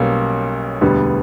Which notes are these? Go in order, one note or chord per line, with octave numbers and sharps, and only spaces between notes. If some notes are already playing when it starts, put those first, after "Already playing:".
Already playing: B1 B2 G3 A#3 C#4
E1 D2 D3 G3 B3